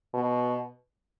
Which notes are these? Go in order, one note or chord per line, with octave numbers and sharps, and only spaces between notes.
B2